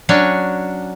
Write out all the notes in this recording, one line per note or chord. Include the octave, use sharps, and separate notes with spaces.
F#3 C#4 D4 C#5